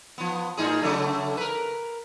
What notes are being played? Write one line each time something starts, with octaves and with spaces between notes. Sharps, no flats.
F3 B3
A2 D#4 G#4
C#3 F#3 A3
A#4 B4